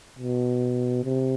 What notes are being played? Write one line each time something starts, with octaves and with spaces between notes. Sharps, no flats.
B2
C3